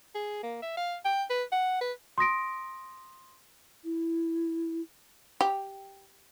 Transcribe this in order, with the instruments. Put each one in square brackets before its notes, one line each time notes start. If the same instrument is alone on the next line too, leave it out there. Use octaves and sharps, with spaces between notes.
[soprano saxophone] G#4
A#3
E5
F5
G5
B4
F#5
B4
[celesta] C6 D#6 A#6 D7
[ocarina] E4
[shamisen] G4